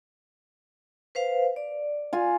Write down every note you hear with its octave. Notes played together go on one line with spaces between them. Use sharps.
B4 C5 F5
D5
F4 G#5